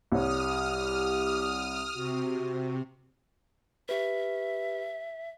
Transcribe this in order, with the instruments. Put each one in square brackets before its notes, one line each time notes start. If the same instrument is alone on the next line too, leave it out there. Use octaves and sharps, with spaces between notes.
[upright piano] C2 C#5 [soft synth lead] G4 [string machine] D#6 F6
[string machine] C3 [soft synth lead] F#4
[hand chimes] G4 B4 [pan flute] E5